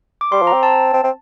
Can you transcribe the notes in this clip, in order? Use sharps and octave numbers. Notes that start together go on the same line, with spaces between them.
D6
G3 C6
F3
A#5
C4
A5
C4
C4